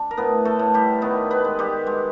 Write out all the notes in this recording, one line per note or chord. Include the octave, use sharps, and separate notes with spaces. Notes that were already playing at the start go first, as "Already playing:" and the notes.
Already playing: D4
A#4
A2 B3 B4
A3 A4
A2
G3 G4
D#3 B3 B4
B3 B4
G#3
G3 G4
G#3